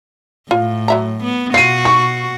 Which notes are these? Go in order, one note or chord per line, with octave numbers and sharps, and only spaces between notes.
A2 F4
F#3 E5 A#5
B3
B2 F4 F#4 C7 D#7
C#6